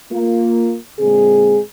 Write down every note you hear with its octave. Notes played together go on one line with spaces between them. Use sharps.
A#3 F4
A#2 D3 G#3 C4 G#4